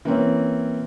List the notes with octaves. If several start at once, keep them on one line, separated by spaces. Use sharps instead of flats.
E3 A#3 C4 C#4